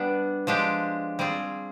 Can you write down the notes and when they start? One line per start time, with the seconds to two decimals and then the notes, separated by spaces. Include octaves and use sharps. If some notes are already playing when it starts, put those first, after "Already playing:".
Already playing: G3 B3 D4
0.47 F3 G#3 D4 G4
1.19 G3 C4 F4 G#4